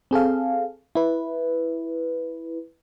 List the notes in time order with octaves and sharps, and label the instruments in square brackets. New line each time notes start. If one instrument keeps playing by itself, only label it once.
[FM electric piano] C4 G#4 A4 F5
E4 B4